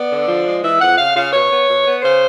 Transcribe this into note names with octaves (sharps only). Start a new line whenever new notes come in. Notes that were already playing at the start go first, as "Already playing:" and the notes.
Already playing: B3 D5
D3
F3
G#3
E3 E5
F2 F#5
C#3 F5
C#3 F5
B2 C#5
B3
B2
B3
C#3 C5